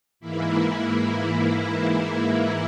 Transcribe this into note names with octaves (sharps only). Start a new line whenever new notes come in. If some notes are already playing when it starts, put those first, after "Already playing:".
G#2 E3 A#3 E4